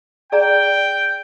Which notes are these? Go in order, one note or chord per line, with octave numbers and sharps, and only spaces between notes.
G#4 D5 G5 A#5